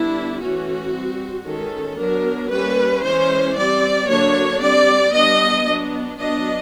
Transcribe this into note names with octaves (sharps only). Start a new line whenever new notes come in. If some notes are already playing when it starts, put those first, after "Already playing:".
Already playing: D3 G3 B3 D4 E4
E3 A3 C#4 F#4
G3 C4
D#3 G#3 C#4 A4
F#3 B3 D4 A#4
G3 A#3 C#4 B4
E3 G#3 C#4 C5
G3 C4 D5
D3 F#3 A#3 D4 C#5
G3 C4 D5
G3 B3 D4 D#5
F#3 B3 D4
F#3 B3 D4 D#5